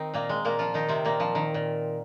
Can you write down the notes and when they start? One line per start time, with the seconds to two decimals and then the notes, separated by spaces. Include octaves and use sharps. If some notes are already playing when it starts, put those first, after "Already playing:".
Already playing: D#3 C4 D#4
0.14 A#2 A#3
0.29 G#3
0.45 A#2 A#3
0.59 F3 F4
0.74 D#3 D#4
0.89 C3 C4
1.05 A#2 A#3
1.20 F3
1.35 D#3
1.54 A#2